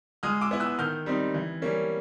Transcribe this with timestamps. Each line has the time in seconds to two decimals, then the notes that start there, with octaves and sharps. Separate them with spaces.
0.23 G#3 D#6 F6
0.41 D6 E6
0.51 B3 E4
0.60 E6 F#6
0.79 D#3 F6 G6
1.06 G3 C4 D#4
1.34 E3
1.62 G3 A#3 C#4